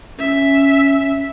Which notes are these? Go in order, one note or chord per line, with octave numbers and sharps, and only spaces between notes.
C#4 E5